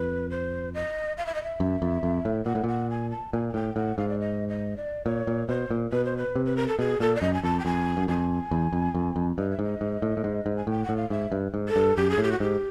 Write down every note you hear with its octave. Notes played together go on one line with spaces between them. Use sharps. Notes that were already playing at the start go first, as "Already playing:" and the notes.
Already playing: F2 B4
C5
D#5
F5
E5
D#5
E5
F#2
F2
F2
A2
A#2 F#5
A2
A#2 F#5
G#5
A5
A#2 G#5
G#5
A2 G5
A2 F#5
G#2 F5
D5
D#5
D#5
D5
A#2 C#5
A#2
B2 C5
A#2
B2 B4
C5
B4
C3
B4
A#4
A4
B2 G#4
A#2 A4
D5
F#2 D#5
G#5
F2 A5
G5
F2 G#5
F#2
F2 G#5
E2
F2
F2
F2
G2 D#5
E5
G#2 D#5
G#2
A2
A2
G#2
G#2
G#5
A2 G5
F#5
A2
F5
G#2 E5
G2
G#2
A4
G2
F#2 G4
G#4
A2
G4
F#4
G#2 G4